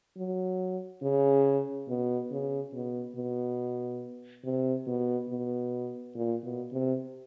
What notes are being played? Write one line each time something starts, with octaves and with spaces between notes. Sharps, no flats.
F#3
C#3
B2
C#3
B2
B2
C3
B2
B2
A#2
B2
C3